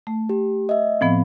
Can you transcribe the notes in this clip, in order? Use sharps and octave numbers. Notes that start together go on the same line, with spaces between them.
A3
G4
D#5 E5
A2 F3 B3 C4